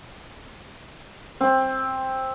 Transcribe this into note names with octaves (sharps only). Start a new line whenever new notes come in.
C4